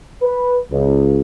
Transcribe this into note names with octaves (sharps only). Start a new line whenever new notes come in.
B4
C#2